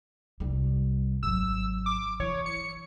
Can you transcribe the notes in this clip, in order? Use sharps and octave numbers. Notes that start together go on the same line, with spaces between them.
C2 G3
G#1 F#3 E6
D6
E3 C#5
C#7